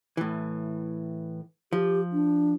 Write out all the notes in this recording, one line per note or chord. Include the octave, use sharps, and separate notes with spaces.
A2 E3
F3 G4
D4